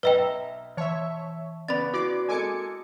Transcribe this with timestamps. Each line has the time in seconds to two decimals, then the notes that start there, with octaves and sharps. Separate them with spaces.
0.03 B1 B4 D#5 E5 G5 A#5
0.77 E3 C#5 E5 A5
1.68 C#3 B3 D5 B5 A6
1.94 E4 F#4 D5 D6
2.29 G#3 A#3 A4 G#5 D6 C#7